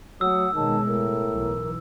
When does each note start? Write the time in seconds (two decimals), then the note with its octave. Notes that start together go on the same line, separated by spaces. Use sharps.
0.21 F#3 A3 F#5 D#6 E6
0.54 B2 D#3 G#3 C#5 A5
0.85 A2 A#4
1.33 B1 E3